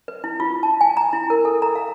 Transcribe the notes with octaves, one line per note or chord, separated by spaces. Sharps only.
B4
E4
F4
A5
G#5
A#5
E4
A#4
A4
A#5
F5